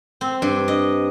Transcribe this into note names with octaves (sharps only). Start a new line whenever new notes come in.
C4
G2
D#5